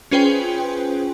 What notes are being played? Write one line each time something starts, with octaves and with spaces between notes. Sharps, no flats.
C#4 F4 G#4 B4 C5 G5